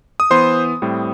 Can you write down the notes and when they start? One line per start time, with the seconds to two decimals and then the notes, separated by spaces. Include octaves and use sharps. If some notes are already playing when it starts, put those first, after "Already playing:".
0.20 D#6
0.30 E3 B3 C5 C6
0.82 A2 G3 C4